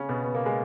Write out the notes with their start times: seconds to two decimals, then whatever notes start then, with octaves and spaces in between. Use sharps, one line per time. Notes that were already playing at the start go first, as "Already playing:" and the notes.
Already playing: C#3 C#4
0.09 B2 B3
0.24 B3
0.35 A#3
0.46 G#3